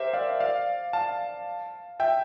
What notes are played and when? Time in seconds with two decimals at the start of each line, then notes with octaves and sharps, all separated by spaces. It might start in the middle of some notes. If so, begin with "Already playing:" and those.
Already playing: G4 A#4 C5 E5
0.13 D5 F5
0.40 D5 F5
0.93 F5 A5
2.00 E5 G5